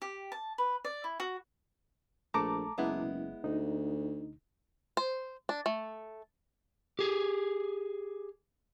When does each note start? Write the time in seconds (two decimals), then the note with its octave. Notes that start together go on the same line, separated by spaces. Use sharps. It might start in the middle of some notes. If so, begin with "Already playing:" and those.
0.02 G4
0.32 A5
0.58 B4
0.85 D5
1.04 E4
1.20 F#4
2.34 A#1 A3 A4 A5 A#5 D6
2.78 F#1 G#3 B3 E4
3.44 D2 D#4
4.97 C5
5.49 D4
5.66 A3
6.99 G4 G#4